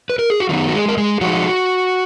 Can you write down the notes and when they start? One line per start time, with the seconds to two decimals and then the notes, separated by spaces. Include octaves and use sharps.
0.10 B4
0.19 A#4
0.30 G#4
0.40 F#4
0.49 D#3 F#3 B3 D#4 F4
0.67 F#4
0.73 G#3 G#4
0.89 A#4
0.98 G#3 G#4
1.21 F3 G#3 D#4 F#4